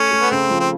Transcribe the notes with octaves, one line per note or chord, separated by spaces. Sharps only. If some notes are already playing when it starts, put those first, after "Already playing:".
Already playing: A3 C#4
A3
B3
C#3 C4
F3
C4